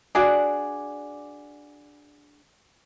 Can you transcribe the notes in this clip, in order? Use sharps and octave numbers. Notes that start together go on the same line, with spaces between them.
D4 F#4 G#4 D5